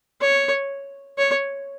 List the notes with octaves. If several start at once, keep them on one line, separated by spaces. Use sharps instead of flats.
C#5
C#5